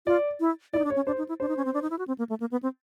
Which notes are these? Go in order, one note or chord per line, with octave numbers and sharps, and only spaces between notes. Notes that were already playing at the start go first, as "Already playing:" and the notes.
F4 D5
E4
E4 D5
D#4
D4
C#5
C#4
D4 C5
D#4
E4
D4 C5
D#4
C#4
C4
D4
D#4
E4
F#4
C4
A#3
A3
A#3
B3
C4